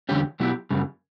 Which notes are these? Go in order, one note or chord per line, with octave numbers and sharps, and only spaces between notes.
E2 D3 G3 C#4 G4
B2 F#3 B3 E4 G4
F#2 C#3 G3